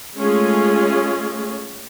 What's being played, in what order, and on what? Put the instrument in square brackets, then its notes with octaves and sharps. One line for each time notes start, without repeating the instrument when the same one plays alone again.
[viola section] G#3 A3 C#4 F4 G#4